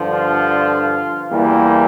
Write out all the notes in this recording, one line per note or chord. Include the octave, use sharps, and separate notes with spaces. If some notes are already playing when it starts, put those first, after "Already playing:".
Already playing: G2 D3 F3
F4
E2 E3 G3 A#3